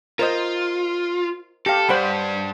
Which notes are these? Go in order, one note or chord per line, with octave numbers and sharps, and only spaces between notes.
F4 A#4 C5 D#5
G4 A4 F5
G2 C5 D5 F#5 B5